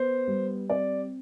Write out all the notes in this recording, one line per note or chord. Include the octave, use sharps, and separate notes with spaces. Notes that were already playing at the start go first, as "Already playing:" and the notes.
Already playing: B3 C5
G3
C4 D5